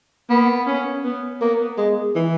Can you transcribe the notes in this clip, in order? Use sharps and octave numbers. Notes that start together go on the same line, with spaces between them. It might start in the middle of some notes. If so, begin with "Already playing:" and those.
A#3 B3
C#4
B3
A#3 B3
G#3
E3